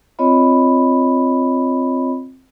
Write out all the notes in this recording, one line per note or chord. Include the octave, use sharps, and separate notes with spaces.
C4 F4 C#5 D#5 B5